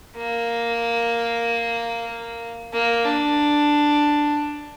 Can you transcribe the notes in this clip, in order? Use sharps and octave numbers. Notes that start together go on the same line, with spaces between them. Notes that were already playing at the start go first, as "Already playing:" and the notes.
A#3
A#3
D4